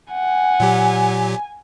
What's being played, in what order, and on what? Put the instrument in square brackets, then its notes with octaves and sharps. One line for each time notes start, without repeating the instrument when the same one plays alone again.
[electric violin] F#5 [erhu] G#5
[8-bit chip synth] A#2 F#3 G4